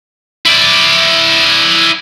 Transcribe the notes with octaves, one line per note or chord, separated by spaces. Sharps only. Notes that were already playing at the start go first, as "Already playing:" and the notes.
E4 D5